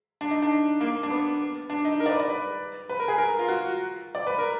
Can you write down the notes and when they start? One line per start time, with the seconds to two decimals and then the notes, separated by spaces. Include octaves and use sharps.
0.21 D4
0.31 D#4
0.42 D4
0.81 A#3
1.03 D4
1.10 B3
1.70 D4
1.85 D#4
2.00 A#4
2.06 D5
2.10 B4
2.20 D5
2.30 B4
2.89 B4
3.00 A#4
3.08 G#4
3.18 A#4
3.39 F4
3.48 F#4
4.15 D5
4.27 B4
4.39 A#4